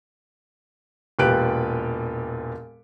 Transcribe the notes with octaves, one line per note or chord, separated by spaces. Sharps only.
E1 A#2 G4 B4 F#6 D7